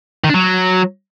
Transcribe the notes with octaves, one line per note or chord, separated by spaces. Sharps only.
D#3
D4
F#3